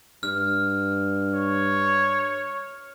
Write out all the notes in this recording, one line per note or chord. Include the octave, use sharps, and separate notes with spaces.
G2 F6
C#5